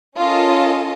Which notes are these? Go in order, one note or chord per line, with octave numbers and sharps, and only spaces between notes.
C#4 F4 A4 A#4 D#5 A5